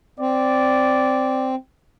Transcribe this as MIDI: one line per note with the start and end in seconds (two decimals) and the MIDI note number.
0.19 1.55 60
0.19 1.53 74